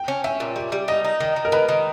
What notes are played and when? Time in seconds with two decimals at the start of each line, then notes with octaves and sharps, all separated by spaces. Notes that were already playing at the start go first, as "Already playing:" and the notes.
Already playing: G5
0.08 C#4
0.24 C#4 E5
0.40 A#2
0.56 G3
0.72 G3
0.88 D#4 D#5
1.04 D#4
1.20 D#3
1.36 D#3
1.45 A#4
1.52 D#3 B4
1.69 D#3